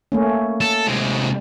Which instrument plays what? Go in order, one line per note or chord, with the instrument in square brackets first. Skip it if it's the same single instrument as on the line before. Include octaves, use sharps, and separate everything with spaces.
[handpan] A3 A#3 C#4
[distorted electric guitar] A4
C3 G#3